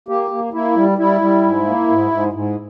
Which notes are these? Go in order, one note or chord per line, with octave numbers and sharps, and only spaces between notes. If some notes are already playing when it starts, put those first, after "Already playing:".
A#3 G4
A#3
A#3 E4
G3
G3 E4
G3
G#2
A#3
G#2
G#2
G#2